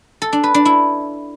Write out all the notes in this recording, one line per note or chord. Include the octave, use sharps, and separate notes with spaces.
A4
D4
B4
D4
E4